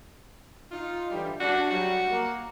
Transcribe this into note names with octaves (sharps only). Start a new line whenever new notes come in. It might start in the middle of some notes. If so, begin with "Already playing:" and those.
D#4 F4
D3 E3 G3
D4 F#4
F#3 G3 F#4
A#3